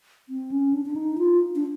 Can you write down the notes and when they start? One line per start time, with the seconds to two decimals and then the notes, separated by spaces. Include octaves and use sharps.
0.29 C4
0.52 C#4
0.73 D4
0.86 D4
0.96 D#4
1.18 F4
1.55 D4